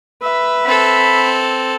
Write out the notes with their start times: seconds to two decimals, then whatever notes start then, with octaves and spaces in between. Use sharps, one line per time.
0.22 B4 E5
0.65 C4 A4 B5